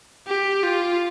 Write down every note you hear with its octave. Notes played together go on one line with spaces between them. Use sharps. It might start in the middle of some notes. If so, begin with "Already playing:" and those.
G4
F4